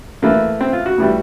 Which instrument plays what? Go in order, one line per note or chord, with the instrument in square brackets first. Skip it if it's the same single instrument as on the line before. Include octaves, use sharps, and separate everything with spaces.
[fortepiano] A2 E3 A3 A#3
C4
F4
F#4
A2 E3 G3